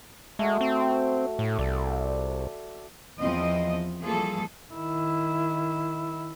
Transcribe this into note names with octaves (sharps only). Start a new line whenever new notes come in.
G#3 A3 F#4
C4
A2
C2 A4 D5
E2 F3 C4 D#5
E3 F3 G3 A#3 G#4 A4
D#3 E4